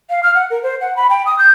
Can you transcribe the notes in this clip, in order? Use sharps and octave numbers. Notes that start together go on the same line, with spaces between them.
F5
F6
F#5
A#4
C5
F#5
B5
G5
D#6
G6